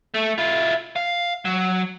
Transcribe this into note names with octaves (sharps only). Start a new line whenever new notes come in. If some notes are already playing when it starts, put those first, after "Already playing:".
A3
E4 F4
F5
F#3